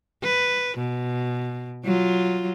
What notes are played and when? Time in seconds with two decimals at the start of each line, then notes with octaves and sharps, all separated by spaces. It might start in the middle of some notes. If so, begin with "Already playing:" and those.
0.24 B4
0.78 B2
1.84 F#3 F4